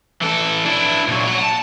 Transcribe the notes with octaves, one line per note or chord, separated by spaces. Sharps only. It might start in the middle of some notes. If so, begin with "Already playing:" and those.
E3 A4
D4 E4
A#2 F#3
F#5 A#5
A5